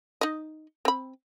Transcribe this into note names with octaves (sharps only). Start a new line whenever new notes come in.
D#4 D#5
C4 B5